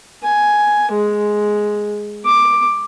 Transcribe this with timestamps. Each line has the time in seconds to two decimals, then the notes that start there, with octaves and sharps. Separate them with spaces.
0.23 G#5
0.92 G#3
2.25 D6